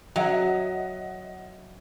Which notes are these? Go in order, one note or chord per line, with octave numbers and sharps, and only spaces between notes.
F#3 D#5 E5 F#5